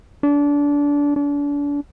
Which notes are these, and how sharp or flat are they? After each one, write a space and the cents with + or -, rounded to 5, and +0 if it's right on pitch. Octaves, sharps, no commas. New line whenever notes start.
D4 -25
D4 -35